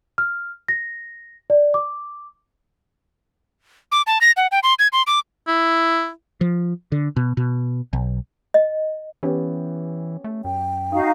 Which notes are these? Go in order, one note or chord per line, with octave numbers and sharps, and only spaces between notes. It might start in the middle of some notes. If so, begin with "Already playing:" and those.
F6
A#6
D5
D6
D6
A5
A#6
F#5
G5
C6
G#6
C6
D6
E4
F3
D3
B2
B2
B1
D#5
E3 B3 C#4 G4
A3
F#2 G5
D#4 F#4 F5 D#6